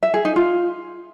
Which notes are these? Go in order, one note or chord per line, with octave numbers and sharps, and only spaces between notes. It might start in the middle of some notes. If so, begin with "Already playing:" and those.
E5
G#4
D#4
F4